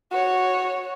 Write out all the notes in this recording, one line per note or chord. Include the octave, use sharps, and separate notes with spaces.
F#4 C#5